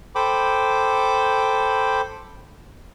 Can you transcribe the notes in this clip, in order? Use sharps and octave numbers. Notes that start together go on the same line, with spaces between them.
A4 C5 G5 B5 D6